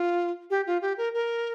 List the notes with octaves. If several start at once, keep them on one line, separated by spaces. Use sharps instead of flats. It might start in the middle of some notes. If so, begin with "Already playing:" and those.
Already playing: F4
G4
F4
G4
A#4
A#4